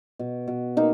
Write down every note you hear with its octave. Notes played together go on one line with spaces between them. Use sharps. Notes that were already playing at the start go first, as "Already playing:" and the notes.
B2
B2
A#3 D#4